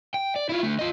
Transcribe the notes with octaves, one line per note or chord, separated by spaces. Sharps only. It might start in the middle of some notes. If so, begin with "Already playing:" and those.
G5
D5
E4 F4
D3 A3
F4 D#5